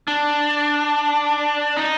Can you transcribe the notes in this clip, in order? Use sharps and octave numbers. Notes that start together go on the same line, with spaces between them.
D4
D#4